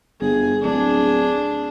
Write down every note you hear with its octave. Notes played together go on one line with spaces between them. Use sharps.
G1 G#4
D1 D4 G#4